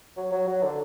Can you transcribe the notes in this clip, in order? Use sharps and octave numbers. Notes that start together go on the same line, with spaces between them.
F#3
F#3
F#3
D3